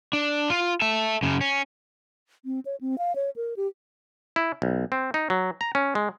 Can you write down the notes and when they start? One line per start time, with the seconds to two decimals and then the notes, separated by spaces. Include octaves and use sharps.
0.13 D4
0.50 F4
0.81 A4 E5
1.23 F#2 C#3
1.41 C#4
2.45 C4
2.66 C#5
2.81 C4
2.98 F5
3.15 C#5
3.36 A#4
3.57 G4
4.36 E4
4.62 B1
4.92 C4
5.14 D#4
5.30 F#3
5.61 A#5
5.75 C#4
5.95 G#3